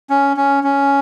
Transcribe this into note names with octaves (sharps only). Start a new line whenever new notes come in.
C#4
C#4
C#4